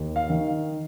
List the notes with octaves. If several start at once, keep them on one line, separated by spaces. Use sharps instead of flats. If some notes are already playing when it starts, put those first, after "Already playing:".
Already playing: D#2
F5
D#3